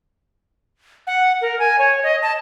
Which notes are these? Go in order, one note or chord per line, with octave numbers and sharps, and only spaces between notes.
F#5
A#4
G#5
C#5
D#5
A5